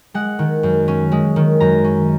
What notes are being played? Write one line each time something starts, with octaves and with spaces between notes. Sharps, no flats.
G#3 F#5
D#3
F#2
C#4
G#3
D#3
F#2 A#5
C#4